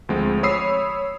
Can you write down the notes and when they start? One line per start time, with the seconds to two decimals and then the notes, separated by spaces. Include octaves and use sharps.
0.09 D2 F3 G#3 C4
0.43 C#5 B5 D#6 E6 C7